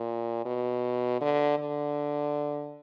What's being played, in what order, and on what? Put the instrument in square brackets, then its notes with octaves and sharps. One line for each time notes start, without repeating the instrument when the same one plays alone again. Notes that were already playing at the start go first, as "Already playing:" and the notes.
Already playing: [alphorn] A#2
B2
D3
D3